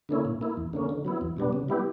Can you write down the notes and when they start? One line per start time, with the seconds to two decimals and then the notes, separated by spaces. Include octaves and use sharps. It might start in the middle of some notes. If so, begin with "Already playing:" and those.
0.09 D3 A#3 C#4 E4
0.25 A#2
0.41 A#3 E4
0.57 E2
0.73 D3 A#3 C#4
0.89 D3
1.05 F#3 B3 E4
1.21 E2
1.37 B2 G3 B3 D4
1.53 C#3
1.69 G3 B3 E4 G4